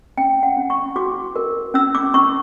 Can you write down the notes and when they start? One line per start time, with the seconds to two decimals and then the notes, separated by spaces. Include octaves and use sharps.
0.17 C#4 G5
0.43 F#5
0.57 C#4
0.70 C#6
0.96 F#4 D6
1.36 A#4
1.74 C#4 E6
1.95 D6
2.14 C#4 C#6